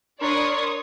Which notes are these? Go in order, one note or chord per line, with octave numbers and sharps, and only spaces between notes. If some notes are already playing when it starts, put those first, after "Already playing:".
D4 A#4 C#5 D5 B5 C6 D#6